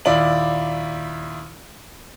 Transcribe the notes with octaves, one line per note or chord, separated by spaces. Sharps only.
D#2 A#2 E4 D5 F#7